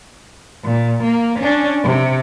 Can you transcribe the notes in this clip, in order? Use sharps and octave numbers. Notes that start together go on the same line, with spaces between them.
A#2
A#3
C#4 D4
C3